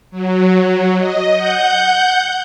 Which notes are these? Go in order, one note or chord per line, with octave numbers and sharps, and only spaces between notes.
F#3
D#5
F#5 G6